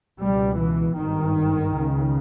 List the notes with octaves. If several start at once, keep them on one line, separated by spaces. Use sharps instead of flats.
C#2 B2 G3
E3
G#1 G2 D#3
C#2 C#3